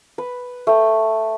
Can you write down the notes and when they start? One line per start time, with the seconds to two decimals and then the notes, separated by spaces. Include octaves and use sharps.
0.18 B4
0.67 A3 G5